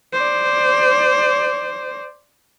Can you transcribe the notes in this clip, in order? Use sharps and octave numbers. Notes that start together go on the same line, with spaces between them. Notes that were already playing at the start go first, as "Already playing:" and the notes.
C5 D5